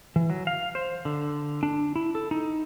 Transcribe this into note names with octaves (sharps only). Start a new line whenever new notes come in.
E3
F#3
F5
C5
D3
D4
E4
A4
D#4